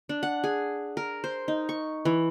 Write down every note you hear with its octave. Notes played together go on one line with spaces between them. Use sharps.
D4
F#5
G#4
A#4
C5
D#4
C#6
E3